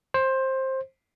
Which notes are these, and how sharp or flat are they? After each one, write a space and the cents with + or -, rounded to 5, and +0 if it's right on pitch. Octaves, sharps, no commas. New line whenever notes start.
C5 +15